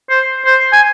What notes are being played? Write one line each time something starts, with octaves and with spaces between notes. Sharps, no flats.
C5
C5
G#5